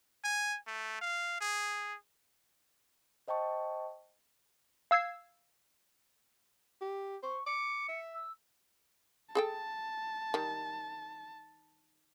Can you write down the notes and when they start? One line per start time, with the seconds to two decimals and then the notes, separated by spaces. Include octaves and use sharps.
0.24 G#5
0.67 A3
1.01 F5
1.41 G#4
3.28 C5 D#5 G5 A5 C#6
4.91 F5 E6 G#6 C7
6.81 G4
7.23 C5 C#6
7.47 D6 C#7
7.89 E5
8.14 E6
9.35 G#4 A4 G5 A5
10.34 D#3 G3